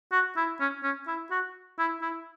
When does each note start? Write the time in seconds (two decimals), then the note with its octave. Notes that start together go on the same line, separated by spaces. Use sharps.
0.12 F#4
0.37 E4
0.60 C#4
0.83 C#4
1.08 E4
1.31 F#4
1.79 E4
2.02 E4